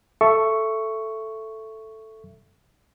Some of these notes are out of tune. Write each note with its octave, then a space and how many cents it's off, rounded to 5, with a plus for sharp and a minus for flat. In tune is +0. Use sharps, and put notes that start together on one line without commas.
A4 +0 E5 +15 C#6 +0